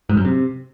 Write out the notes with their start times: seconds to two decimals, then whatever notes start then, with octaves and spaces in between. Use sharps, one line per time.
0.09 G#2
0.17 F#2
0.25 C3